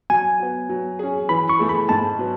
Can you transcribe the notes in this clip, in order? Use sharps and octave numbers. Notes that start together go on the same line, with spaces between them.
F#3 G#5
B3 F#4
F#3
C#4 G#4
E3 B5
C#6
A3 E4 G#4
B5
G#2 A5
F#3 B3